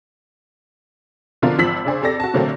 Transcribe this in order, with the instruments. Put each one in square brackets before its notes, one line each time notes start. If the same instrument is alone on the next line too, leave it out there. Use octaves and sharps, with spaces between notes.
[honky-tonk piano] B2 D3 F3 D4 F4 A#4
G#1 F3 E6 B6 F#7
C#3 D4 G#4 C5
F2 G4 A4 D5 A#6
F#4 A5
A#2 D3 F#3 A3 A#3 C4